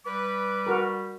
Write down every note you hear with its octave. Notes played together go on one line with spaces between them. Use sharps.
G3 B4 D6
F#4 A#4